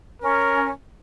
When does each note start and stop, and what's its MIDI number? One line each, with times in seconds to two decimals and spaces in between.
0.22 0.70 61
0.22 0.71 70